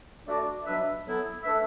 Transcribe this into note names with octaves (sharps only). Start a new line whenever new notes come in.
A3 D4 F#4 D5
B2 F#3 D4 B4 E5
F#3 B3 E4 A4
A3 D4 B4 E5